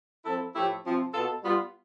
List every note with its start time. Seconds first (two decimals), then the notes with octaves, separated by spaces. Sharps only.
0.25 F3 C4 E4 A4
0.55 A2 F3 A3 E4 G4
0.85 C3 F3 C4
1.14 B2 B3 F4 A4
1.44 G3 B3 F4